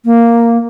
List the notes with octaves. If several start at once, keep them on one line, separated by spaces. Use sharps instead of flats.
A#3